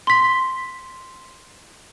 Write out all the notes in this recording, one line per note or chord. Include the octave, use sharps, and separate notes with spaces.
C6 B6